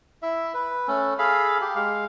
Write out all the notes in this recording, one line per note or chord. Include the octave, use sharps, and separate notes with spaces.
E4 E5
B4
A3 C#4 A4
G#4 A4 F5 B5
G4
G#3 F5